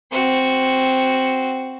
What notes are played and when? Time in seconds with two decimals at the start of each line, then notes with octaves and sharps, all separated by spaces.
0.11 C4 F#4